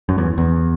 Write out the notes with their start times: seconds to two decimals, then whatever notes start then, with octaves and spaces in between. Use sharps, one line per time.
0.09 F#2
0.18 E2
0.38 E2